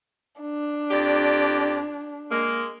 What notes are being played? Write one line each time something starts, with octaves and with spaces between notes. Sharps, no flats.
D4
F2 G4 D5
G#3 A#3